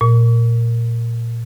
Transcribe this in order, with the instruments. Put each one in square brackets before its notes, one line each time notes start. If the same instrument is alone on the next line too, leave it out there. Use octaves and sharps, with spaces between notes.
[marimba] A#2